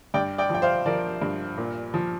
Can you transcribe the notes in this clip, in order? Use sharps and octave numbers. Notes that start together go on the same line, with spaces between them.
G2 D5 G5
D5 G5
F3 G5
C5 F5
F3 A#4 D5
G2
A#2
F3